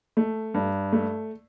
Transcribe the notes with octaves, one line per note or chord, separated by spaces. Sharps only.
A3
G2
A3